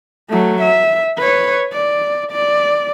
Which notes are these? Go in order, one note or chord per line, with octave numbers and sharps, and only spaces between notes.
F#3 A3
E5
B4 C#5
D5
D5